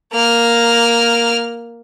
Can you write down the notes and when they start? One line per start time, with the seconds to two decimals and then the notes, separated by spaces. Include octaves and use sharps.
0.13 A#3 F6